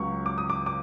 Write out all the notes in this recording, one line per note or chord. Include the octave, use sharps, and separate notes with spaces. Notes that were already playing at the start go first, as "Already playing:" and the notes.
Already playing: C#2 C#3 F#3 C#6
D6
D#6
D6
D6